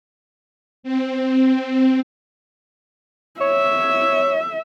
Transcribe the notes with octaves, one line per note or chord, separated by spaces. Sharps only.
C4
C#5 E5